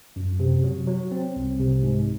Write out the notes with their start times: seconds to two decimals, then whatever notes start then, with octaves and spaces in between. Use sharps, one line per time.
0.16 F#2
0.39 C3
0.64 F#3
0.87 F#3
1.11 C4
1.36 C2
1.59 C3
1.83 G#2